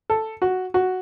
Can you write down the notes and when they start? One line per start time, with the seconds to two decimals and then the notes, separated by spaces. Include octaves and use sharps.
0.10 A4
0.42 F#4
0.74 F#4